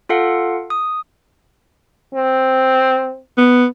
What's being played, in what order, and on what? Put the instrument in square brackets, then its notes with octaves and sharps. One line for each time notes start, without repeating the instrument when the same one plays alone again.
[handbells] F4 A4 F5 F#5
D#6
[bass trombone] C4
[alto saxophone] B3